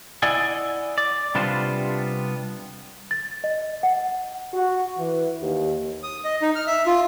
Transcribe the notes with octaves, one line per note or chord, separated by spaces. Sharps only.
E4 D5 D#5 F#5 G#5
D5
C3 G3 B3 D4 F4 C5
A6
D#5
F#5
F#4
E3
D#2
D#6
D#5
D#4
F6
E5
F4